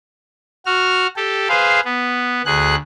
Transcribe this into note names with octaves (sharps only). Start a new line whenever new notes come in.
F#4 F6
G4 A4
G#4 B4 C5 F5
B3
D2 G#4 F#6